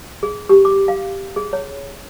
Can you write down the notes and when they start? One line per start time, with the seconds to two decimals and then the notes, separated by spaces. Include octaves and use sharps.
0.23 G#4
0.49 G4
0.65 D6
0.88 F5
1.36 G#4
1.53 C#5